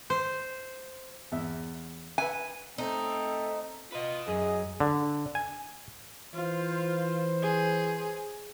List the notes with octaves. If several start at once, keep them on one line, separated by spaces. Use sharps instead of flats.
C5
E2 E5
B4 E5 F#5 G#5
A3 C4 D#4
F4 B4 D#5
F#2 G#4 D#5
D3
G#5
E3 F4 B4 C5
G#4